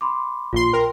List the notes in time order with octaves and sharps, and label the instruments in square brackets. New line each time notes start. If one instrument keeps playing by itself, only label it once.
[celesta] B5 C6 D6
[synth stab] A#1 C6 [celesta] F4
[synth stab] A#4 [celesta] G5 C6